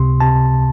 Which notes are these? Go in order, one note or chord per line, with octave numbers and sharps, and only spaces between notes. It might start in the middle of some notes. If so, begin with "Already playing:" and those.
Already playing: C#2 C3 C6
C3 A5